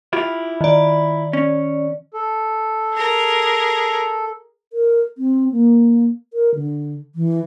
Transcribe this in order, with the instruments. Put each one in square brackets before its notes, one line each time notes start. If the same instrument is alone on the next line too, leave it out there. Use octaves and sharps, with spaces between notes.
[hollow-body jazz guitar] E4 F4 G4
[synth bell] D#3 D5
[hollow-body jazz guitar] C#4
[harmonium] A4
[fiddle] G#4 A#4
[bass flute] A#4
C4
A#3
A#4
D3
E3